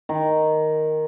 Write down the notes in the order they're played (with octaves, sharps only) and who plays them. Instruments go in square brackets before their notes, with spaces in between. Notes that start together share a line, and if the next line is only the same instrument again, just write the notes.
[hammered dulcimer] D#3